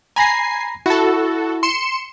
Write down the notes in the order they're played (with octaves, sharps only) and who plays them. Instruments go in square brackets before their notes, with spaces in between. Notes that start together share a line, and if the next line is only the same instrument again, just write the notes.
[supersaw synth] G#5 C7 [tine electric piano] A#5 B5 A#6
[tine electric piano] E4 [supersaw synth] F#4 A4
[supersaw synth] C6 C#7 E7